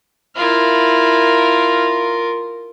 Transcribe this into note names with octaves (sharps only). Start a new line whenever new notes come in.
E4 F4 A#4 F5